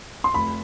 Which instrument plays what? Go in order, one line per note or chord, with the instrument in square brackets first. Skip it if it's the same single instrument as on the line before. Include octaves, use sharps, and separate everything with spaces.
[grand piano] C6
F1 B5